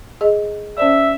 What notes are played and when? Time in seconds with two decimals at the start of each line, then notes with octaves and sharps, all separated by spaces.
0.21 G#4 D#5
0.78 C#4 C5 D5 E5